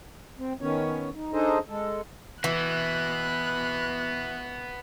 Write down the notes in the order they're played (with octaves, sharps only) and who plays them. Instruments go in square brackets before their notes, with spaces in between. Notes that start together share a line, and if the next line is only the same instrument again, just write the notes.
[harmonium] C4
D#3 B3 C#4 C#5
D#4
D4 D#4 G#4 A4 C5 D#5
G#3 A4
[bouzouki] E3 [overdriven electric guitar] B3 F#4 [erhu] F#6